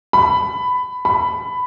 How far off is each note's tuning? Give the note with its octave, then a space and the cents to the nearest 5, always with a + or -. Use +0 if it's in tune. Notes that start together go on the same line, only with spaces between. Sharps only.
B5 +15
B5 +15